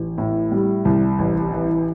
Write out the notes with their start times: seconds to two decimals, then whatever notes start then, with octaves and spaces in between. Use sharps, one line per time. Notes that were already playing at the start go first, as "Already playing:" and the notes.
Already playing: A1
0.18 A2
0.52 G3
0.85 C2
1.19 A1
1.53 E3